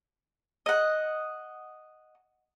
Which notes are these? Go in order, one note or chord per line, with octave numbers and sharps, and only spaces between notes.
D#5 F#5